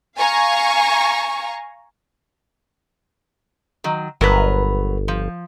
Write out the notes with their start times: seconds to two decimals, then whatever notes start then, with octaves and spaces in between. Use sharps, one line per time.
0.18 F5 G#5 A#5 C#6
3.84 D#3 F#3
4.21 G1 F#3 A#4 B4
5.08 F3